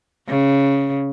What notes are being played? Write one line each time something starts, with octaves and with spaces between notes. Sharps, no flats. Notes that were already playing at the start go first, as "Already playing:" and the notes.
C#3